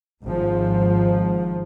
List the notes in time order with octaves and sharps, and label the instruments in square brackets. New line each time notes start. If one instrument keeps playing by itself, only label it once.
[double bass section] G#1 G#2 F3